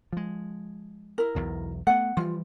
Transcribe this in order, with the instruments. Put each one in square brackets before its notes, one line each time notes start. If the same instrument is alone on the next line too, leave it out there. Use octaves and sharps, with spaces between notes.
[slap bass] F3 G#3
[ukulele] E4 A#4
[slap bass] B1 E2 B2
[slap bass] A3 B3 [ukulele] F#5
[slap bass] E3 F3 G3 [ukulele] F4